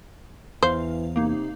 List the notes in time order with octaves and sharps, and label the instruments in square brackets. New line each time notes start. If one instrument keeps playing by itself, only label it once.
[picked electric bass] E2 [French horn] E3 [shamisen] C5 [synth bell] F5
[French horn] C3 [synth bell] A#3 D#4